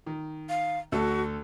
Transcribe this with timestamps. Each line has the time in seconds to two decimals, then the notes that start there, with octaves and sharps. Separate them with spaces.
0.06 D#3
0.49 F5
0.92 D2 F#4 A4